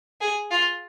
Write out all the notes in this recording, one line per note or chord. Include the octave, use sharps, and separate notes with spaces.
G#4
F4